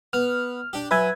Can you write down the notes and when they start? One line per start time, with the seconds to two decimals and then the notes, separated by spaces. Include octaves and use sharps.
0.13 B3 F6
0.73 D4 G4
0.91 F#3 B4 E5 G#5